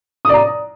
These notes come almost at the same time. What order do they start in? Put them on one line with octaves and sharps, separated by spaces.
D#6 D5 A#5